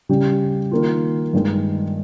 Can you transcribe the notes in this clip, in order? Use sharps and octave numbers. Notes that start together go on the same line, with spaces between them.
C#3 G3 C#4 G4
D#3 A#3 F4
G2 D#3 G#3